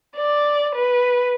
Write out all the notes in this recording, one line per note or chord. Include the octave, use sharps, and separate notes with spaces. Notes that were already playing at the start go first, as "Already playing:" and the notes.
D5
B4